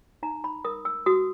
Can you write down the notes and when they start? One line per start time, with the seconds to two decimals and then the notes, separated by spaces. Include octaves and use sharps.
0.23 D#4 A#5
0.44 B5
0.65 A#4 D#6
0.85 E6
1.06 F#4 D#6